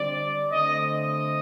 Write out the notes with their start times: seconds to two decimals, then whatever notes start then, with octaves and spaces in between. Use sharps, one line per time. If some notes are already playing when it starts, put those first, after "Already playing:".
Already playing: D3 G3 C4 D5
0.52 D3 A3 C4 D#5
0.83 D#5